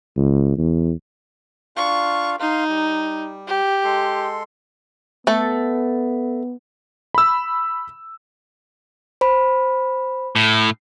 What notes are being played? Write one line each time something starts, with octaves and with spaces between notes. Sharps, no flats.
C#2
E2
D4 F4 F5 C#6
D#4 F5 C6
G3
G4
G#3 A4 C6
A3 B3 A4
B5 E6
C5 B5
A2